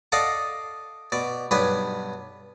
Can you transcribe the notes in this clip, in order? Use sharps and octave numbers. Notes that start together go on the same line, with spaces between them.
A4 D5 D#5 F5 F#5 A5
B2 D5
B1 G2 B3 D4 B4